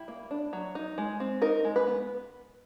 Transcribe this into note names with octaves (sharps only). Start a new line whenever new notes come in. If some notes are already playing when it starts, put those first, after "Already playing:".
Already playing: G3 E4
A#3
D4
F#3
D#4
G#3
C4
D#4 A#4
G#3
B4
B3